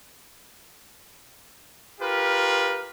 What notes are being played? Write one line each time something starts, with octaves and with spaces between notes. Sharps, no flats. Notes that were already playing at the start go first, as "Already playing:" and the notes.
F4 G4 A#4 B4